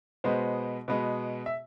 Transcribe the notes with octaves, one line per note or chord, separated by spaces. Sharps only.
B2 G#3 B3 C5
B2 G#3 B3
E5